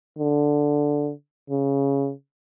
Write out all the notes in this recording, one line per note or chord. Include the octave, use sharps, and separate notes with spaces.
D3
C#3